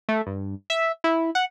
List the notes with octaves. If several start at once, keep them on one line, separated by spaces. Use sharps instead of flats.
A3
G2
E5
E4
F#5